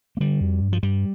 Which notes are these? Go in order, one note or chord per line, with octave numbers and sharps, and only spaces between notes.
A#3
D3 G3
F2
G2
F3
G2 G3